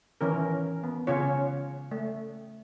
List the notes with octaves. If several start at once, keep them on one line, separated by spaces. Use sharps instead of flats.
D#3 E3 C#4 A#4
B3
C#3 C#4 F4 C#5
A3